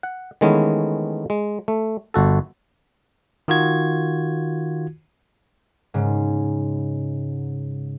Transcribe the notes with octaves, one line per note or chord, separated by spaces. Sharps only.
F#5
D#3 E3 G#3 A3 B3 C#4
G#3
A3
G1 F#4 A4
D#3 F4 F#4 G#6
G#2 C#3